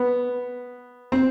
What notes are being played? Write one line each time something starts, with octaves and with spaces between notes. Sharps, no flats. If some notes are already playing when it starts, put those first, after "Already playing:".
Already playing: B3
C4